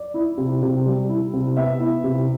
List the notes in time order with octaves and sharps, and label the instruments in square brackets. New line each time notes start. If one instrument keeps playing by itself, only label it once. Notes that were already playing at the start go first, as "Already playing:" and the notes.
Already playing: [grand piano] D5
E4
C3
C3
G3
E4
C3
B3 E5
E4
C3